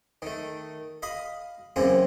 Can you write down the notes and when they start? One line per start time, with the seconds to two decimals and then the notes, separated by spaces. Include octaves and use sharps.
0.22 D#3 A3
1.02 D#5 F5 B5 D#6
1.76 F#2 C#3 E3 A#3 C4